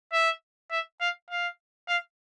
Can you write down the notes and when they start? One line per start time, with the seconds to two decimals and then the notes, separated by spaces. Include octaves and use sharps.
0.13 E5
0.71 E5
1.00 F5
1.30 F5
1.88 F5